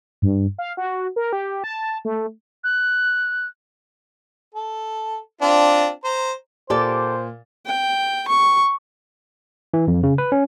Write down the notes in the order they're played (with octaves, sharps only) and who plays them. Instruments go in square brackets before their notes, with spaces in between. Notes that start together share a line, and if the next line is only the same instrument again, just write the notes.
[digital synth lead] G2
F5
F#4
A#4
G4
A5
A3
[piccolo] F#6
[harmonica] A4
C4 D4 F4
C5 A#5
[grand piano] A#2 [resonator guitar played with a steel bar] G4 A4 D5 [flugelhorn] C5
[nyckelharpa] G5
C#6
[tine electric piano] E3
F2
C#3
B4
C#4